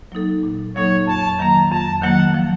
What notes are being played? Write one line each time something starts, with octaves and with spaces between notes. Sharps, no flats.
F#3 A#3 D#4 A4
A#2
F#3 A#3 D#4 A4 C#5
F2 A5
D#3 F#3 A#3 A#5
F2 A5
D#3 F#3 A#3 F#5
F3